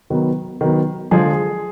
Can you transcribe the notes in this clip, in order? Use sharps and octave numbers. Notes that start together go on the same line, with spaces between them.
D#3 F#3 B3
D#3 F#3 B3
D3 F3 G#3 G#4